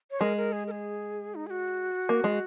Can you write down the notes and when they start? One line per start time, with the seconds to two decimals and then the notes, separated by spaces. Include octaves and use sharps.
0.11 C#5
0.20 G#3 A#4
0.37 A#4
0.52 G#4
0.67 A#4
0.71 G#4
1.35 D#4
1.47 G#4
1.50 F#4
2.09 A#3
2.24 G#3